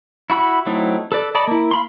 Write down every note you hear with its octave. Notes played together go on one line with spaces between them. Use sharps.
E4 F#4 B5 E6
F#3 A3 C4 D#4 E4
A4 B4 D5
A4 D5 D#5 A5 B5
A#3 E4
F5 B5 C6